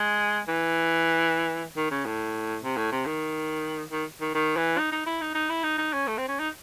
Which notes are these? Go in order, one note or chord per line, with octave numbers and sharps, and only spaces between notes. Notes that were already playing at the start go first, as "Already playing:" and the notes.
Already playing: G#3
E3
D#3
C#3
A2
C3
A2
C3
D#3
D#3
D#3
D#3
E3
D#4
D#4
E4
D#4
D#4
E4
D#4
D#4
C#4
A3
C4
C#4
D#4